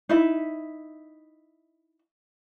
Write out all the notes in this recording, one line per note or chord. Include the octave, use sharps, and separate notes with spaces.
D#4 E4 E5